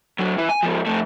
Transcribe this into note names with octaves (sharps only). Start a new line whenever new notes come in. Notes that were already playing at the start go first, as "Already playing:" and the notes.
D2 F#3
E3
G#5
G#2 F3
F2 A3